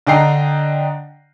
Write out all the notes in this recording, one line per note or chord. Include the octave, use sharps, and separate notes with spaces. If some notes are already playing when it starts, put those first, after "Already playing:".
D3 D4 D#5 G5 A#5 C7